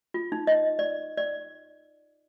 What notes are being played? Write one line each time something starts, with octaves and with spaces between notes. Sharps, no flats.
F4
D#4
D#5
D5
D5